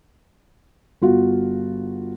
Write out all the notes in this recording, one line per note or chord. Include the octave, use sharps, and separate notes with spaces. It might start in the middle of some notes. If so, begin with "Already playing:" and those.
G1 F4 F#4